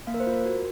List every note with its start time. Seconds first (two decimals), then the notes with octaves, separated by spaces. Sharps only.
0.07 A#3 F5
0.14 A#4
0.20 C5
0.27 F4
0.33 A#4
0.46 F#4